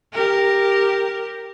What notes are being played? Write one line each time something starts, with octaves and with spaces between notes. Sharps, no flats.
G4 A#4